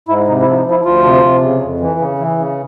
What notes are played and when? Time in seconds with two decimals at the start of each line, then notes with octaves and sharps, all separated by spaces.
0.08 G#2 E4
0.27 C3 D#4
0.42 E4
0.47 F3
0.56 D#4
0.66 F3 E4
0.85 D2 F3 F4
1.04 C3
1.23 C3
1.42 C#3
1.62 F2
1.80 E3
1.99 C#3
2.18 E3
2.38 C#3